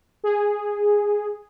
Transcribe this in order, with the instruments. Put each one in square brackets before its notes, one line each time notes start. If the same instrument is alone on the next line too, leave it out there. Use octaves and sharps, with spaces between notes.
[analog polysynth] G#4